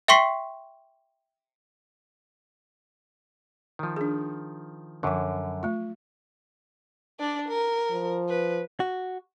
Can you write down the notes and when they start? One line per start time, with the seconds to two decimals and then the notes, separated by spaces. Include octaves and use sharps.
0.08 E5 G5 C6 C#6 B6 C7
3.79 D#3 F3
3.96 D4 G#4
5.03 F#2 D3 F3 F#3
5.63 A3 F4
7.20 D4 D5
7.48 A#4
7.91 F3
8.29 B4
8.80 F#4